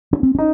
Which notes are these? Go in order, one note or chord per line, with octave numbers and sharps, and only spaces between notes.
C#4
C4
C#4 D#4